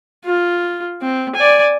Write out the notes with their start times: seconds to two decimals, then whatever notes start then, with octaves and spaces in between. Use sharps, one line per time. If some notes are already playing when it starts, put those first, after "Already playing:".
0.25 F4
1.02 C4
1.35 D5 G#5